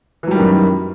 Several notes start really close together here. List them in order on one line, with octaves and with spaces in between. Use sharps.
E3 F#3 G3 D#3 F#2